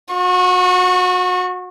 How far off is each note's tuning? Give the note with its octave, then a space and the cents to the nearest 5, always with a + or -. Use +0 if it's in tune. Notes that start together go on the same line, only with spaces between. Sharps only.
F#4 -30 C#6 +0